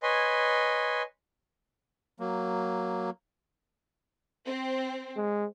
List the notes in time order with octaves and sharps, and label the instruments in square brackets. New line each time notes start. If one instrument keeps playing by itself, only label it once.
[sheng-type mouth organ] B4 C#5 D#5 G#5 C6
[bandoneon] F#3 A#3
[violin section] C4
[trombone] G#3